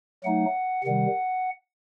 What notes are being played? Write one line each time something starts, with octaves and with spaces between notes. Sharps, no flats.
F#3 A3 D#4 F#5
C3 D#3 G3 F#5